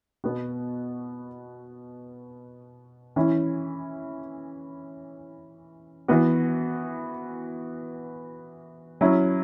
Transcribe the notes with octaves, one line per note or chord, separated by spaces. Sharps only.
B2 B3 F#4
E3 C#4 E4
E3 B3 F#4
F#3 C#4 E4